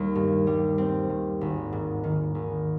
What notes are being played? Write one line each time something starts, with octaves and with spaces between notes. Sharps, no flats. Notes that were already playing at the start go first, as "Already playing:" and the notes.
Already playing: D#2 G3
G2
G3
C4
G2
G#1
G#2
D#3
G#1